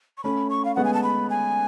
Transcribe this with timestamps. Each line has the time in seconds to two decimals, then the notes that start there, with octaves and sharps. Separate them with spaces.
0.18 C#6
0.24 A3 C#4 B5
0.50 C#6
0.65 F5
0.75 G#3 B3 F#5
0.85 G#5
0.94 A5
1.03 B5
1.30 G#5